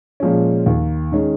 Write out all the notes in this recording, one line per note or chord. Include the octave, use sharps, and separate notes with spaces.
A#2 F3 G#3 C#4
D#2
D#3 G#3 C#4